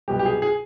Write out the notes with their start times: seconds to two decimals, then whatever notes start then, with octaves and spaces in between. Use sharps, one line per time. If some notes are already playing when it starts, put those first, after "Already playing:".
0.08 C2 B2 F#3 G4
0.19 G4
0.26 G#4
0.42 G#4